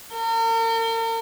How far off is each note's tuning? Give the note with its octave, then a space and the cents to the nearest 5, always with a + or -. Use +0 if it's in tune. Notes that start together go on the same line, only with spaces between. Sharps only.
A#4 -40